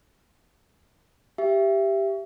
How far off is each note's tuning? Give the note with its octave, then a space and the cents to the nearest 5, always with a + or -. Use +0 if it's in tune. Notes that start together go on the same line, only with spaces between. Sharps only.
G4 +0 E5 +25